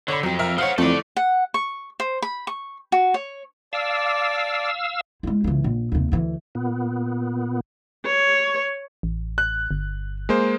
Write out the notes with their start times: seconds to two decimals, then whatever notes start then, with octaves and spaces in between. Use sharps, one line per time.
0.08 D3 C#5 B5
0.23 F2 F#3 C4
0.39 A#4 E5 F6
0.58 C5 C#5 F5 F#5
0.78 F2 E3 A3 A4 D5
1.17 F#5
1.54 C#6
2.00 C5
2.22 B5
2.47 C#6
2.92 F#4
3.14 C#5
3.73 D5 F5 A5 D6 E6
5.23 G#3 E4
5.44 C#2 E3
5.64 A#1
5.92 D#2 C3
6.12 D2 E3
6.55 A#2 B3
8.05 C#5
9.03 A1
9.38 F#6
9.71 G1
10.29 G#3 A#3 C5